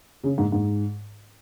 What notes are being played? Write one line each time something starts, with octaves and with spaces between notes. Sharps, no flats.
C#3
G#2
G#2